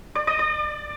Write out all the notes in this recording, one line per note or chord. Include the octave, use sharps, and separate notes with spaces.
D5
D5
D5